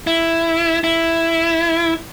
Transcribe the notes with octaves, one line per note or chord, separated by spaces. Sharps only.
E4
E4